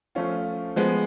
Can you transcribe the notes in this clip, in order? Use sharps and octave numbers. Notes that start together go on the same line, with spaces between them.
F3 A3 C#4 F4
F3 G#3 B3